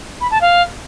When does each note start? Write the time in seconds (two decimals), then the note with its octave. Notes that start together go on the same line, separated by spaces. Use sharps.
0.21 B5
0.31 A5
0.41 F5